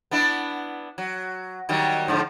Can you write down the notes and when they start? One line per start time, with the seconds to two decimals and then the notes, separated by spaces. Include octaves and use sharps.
0.11 B3 D4 E4
0.98 F#3
1.69 D#3 F#3 G3
2.08 G#2 D3 F3